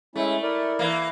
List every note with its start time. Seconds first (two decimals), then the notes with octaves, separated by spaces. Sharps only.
0.16 G#3 A3 C#4 E4
0.43 E4 A#4 D5
0.79 E3 A#3